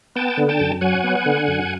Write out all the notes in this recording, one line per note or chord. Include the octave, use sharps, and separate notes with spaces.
B3 G5 A5
D3
G5 A5
F#2
F#3 F#5 G#5
B3
D3
F#2